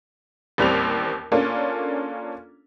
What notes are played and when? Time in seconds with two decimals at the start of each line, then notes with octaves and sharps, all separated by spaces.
0.58 A1 D#2 G3 C4 F7
1.32 A#3 C#4 D4 F4 A4